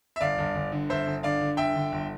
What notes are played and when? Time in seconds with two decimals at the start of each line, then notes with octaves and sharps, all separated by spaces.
0.16 E5
0.21 G1 D5 F5
0.38 G1
0.55 G1
0.72 D3
0.90 G1 C5 E5
1.06 G1
1.23 D3 D5 F5
1.41 D3
1.57 G1 E5 G5
1.75 D3
1.92 G1